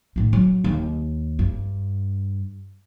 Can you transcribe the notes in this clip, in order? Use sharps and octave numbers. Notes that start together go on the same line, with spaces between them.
A2 D#3
F#3
D#2
G2